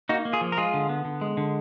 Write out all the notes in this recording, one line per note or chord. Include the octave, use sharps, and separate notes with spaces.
A#3 D#4 F#4
A#3
F4 G#4
F3
A#4
G#3 F4 G#4
D3
B3
D3
G#3
D3